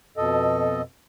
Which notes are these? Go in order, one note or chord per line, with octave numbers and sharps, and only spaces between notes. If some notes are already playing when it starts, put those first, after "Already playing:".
F2 B2 A4 D#5